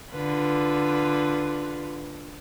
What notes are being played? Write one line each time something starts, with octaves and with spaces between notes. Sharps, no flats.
D3 F4 B4